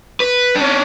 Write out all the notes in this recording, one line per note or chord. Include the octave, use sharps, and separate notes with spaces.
B4
C#4 D4